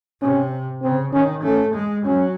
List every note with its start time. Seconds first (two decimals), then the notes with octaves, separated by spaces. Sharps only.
0.21 C3 C#4
0.82 C#3 C4
1.13 D#3 C#4
1.43 A3 C#4
1.75 G#3
2.05 F#3 C#4